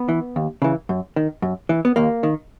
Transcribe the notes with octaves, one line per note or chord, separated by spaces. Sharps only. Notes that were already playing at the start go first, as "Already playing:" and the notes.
Already playing: B3
E3
D#2
C#3 E3
F#2
D#3
F#2
E3
B3
D#2 A#3
D#3